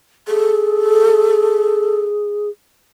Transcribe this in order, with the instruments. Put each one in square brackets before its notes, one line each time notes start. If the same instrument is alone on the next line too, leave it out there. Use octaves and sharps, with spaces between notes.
[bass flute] G#4 [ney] A4